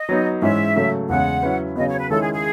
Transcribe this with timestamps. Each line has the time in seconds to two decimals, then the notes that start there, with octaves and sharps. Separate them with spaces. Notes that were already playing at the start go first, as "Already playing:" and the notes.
Already playing: D#5
0.09 F#3 B3 D#4
0.42 G#2 E3 G#3 C#4 E5
0.76 C#3 F#3 A3
1.09 E2 C#3 G#3 F#5
1.43 F#3 C#4 E4 B4
1.76 C#3 F#3 B3 D#5
1.87 C#5
1.99 B4
2.10 D#3 G#3 C#4 E4 A4
2.21 G#4
2.32 G#4